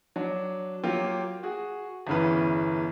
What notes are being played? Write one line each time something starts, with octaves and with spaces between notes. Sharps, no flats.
F#3 D4
F#3 A#3 F4 G4
F#4 G#4
G1 E2 C#3 E3 B4